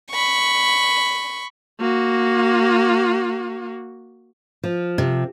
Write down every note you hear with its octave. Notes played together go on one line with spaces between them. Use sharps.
B5 C#6
A#3 F#4
F3
C3